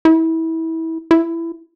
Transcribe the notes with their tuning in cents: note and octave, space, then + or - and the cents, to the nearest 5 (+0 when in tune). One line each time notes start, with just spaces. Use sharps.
E4 -25
E4 +15